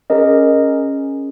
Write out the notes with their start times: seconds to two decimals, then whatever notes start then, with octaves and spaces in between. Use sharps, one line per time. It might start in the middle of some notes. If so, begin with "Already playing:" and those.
0.10 C#4 G#4 A#4 D#5